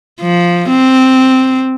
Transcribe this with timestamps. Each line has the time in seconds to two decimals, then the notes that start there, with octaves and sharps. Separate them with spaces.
0.21 F3
0.69 C4